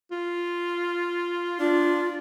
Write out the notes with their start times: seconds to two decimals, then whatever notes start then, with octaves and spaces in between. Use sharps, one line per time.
0.12 F4
1.60 D4 F4